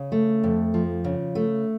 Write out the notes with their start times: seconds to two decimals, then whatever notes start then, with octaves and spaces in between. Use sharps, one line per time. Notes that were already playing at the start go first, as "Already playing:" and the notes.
Already playing: C#3
0.12 A3
0.44 F2
0.74 F3
1.04 C#3
1.35 A3